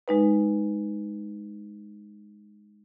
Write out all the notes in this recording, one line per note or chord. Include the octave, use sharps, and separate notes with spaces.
G#3 D#4 B4